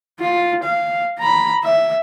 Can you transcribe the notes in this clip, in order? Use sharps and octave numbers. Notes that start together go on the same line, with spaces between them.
F4
F5
A#5 B5
E5